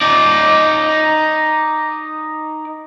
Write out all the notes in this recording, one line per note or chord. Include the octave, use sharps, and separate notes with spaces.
D#4 D5